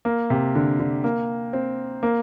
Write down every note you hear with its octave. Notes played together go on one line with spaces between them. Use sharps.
A#3
C3
D3
D3
A#3
C4
A#3